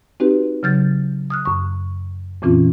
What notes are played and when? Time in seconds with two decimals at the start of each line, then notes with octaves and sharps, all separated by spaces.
0.20 C4 D#4 F#4 G4 B4
0.63 C#3 F#3 F6 G6 A6
1.30 D#6 F6 F#6
1.45 F#2 C#6
2.42 F2 A#2 E3 C4 C#4 F4